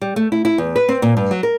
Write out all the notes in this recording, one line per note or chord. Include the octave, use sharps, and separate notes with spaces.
G3
A3
E4
E4
E2
B4
C4
A#2
G2
F#3
A#4